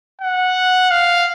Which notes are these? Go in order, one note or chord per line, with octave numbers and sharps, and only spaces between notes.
F#5
F5